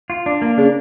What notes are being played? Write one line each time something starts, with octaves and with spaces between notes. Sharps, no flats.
F4
D4
A#3
C#3 D4